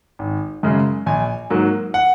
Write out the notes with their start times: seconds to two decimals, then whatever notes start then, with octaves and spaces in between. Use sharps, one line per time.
0.19 G#1
0.63 F#2 C#3 G#3
1.06 A#1 G#5
1.50 G#2 F#3 A#3
1.94 F#5